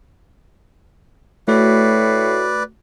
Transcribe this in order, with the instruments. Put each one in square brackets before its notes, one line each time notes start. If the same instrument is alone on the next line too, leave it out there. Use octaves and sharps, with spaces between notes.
[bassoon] A2 [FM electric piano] A3 F#4 [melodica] B4 D5